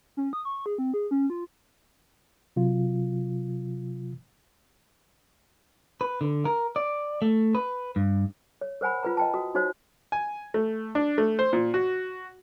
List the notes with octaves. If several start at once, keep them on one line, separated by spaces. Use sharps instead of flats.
C#4
D#6
C#6
G#4
C4
G#4
C#4
F4
C3 F#3 F4
B4
D3
A#4
D5
A3
B4
G2
C#5
A#4 C5 F#5 G#5 B5
F4 B4 A#5
D#5 G5 A5
F#4 D#6
D#4 F#4 C5 C#5
G#5
A3
D4
A3
C5
A#2
F#4